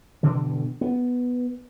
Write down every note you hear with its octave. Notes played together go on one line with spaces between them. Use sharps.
G2 B2 D3 E3
B3